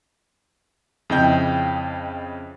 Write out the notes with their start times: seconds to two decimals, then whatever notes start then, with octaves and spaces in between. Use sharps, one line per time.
1.10 F2 C#3 E4 D#5 G5 G6